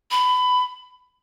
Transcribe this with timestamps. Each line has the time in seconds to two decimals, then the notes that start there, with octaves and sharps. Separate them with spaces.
0.11 B5